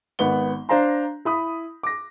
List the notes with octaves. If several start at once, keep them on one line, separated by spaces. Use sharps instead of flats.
G#1 B3 F#5 G7
D4 C5 F5 A#5 C6
E4 B5 D#6
D6 A#6